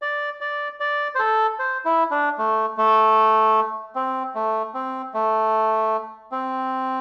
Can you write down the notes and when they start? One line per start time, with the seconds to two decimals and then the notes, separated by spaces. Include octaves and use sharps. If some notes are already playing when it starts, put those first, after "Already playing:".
0.02 D5
0.41 D5
0.80 D5
1.15 C5
1.19 A4
1.59 C5
1.85 E4
2.11 D4
2.38 A3
2.78 A3
3.95 C4
4.35 A3
4.74 C4
5.14 A3
6.32 C4